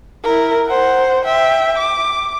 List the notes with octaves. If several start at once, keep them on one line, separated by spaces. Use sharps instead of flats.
E4 A#4
C5 F#5
E5 G5
D6